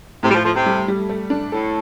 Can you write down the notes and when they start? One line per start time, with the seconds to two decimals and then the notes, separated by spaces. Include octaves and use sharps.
0.23 A2 C3
0.30 G3
0.34 F3
0.45 F3 A4
0.55 C3
0.66 G3
0.88 G3
1.09 A3
1.30 D4
1.52 A2 A4